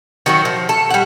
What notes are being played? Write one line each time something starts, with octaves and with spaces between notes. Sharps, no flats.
D#3 F#3 F#4
F3
A4
G3 F#5